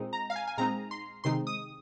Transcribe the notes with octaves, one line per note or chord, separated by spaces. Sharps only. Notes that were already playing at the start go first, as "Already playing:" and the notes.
Already playing: A#2 G#3 C4 D#4
A#5
F5
G#5
G#5
A#2 G#3 C4 D#4 A#5
C6
C3 D#3 G#3 C4 D#4 C6
D#6